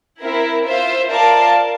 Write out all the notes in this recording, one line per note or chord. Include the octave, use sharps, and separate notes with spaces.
C4 E4 A#4
F4 C5 E5
F4 A#4 D5 F5 A5